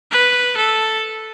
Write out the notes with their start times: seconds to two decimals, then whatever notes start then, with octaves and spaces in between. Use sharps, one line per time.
0.12 B4
0.58 A4